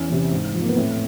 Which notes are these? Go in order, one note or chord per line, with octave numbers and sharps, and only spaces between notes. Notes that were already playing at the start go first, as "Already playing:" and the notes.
Already playing: E2 C#4
C3 E3
G#2
F3
A#3
B3
A2 C4